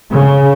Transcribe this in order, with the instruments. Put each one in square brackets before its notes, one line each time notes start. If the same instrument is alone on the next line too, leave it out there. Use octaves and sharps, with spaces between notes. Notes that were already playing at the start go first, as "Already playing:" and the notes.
[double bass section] C#3